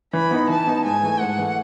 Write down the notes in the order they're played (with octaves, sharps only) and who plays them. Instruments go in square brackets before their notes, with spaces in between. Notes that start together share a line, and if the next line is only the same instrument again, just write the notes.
[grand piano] E3 [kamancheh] B5
[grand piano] B3 D#4
[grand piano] E3 [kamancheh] A5
[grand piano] B3 D#4
[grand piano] G#2 [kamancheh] G#5
[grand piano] E3 A3
[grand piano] G#2 [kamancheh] F#5
[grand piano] E3 A3